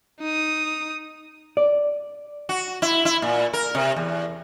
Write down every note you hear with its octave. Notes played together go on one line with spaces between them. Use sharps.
D#4 D#6
D5
F#4
E4
E4
A#2
A#4
C3
E2